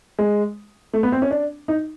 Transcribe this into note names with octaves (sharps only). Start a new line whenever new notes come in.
G#3
A3
B3
C4
C#4
D4
D#4